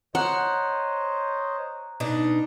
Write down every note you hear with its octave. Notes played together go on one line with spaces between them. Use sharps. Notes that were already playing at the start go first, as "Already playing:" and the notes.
C5 C#5 D#5 F#5 A#5 F#6
B2 D4 D#4